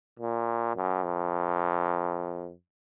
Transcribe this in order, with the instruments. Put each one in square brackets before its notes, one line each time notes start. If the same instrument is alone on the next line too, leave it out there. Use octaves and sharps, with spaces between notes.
[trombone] A#2
F#2
F2